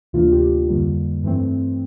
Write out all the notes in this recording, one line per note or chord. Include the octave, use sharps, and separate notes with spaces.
D2 C3 E3 A#3 D4 F4
G4
F2 D3 G3 A#3
G2 E3 A3 C4